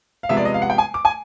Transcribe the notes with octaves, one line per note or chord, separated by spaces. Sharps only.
F5
C3 F3 G#3 B3 E5
D5
D#5
F5
F#5
G5
G#5
D6
G#5